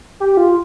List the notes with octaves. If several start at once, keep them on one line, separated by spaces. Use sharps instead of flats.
G4
F4